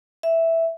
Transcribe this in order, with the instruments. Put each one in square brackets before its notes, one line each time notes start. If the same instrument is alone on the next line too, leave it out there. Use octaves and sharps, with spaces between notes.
[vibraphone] E5